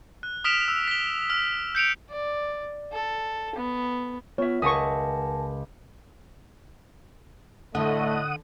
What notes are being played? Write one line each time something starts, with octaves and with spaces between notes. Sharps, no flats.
F#6
D#6 F6 B6 D7 E7 F7
E6
B6 G7
F6
G6 C#7 D7 F7
D5
A4
B3
B3 F4 C#5 E5
C#2 A#4 E5 F#5 G#5 A5 C#6 D#6
A2 D3 A3 D4 D#5 F#5 D#6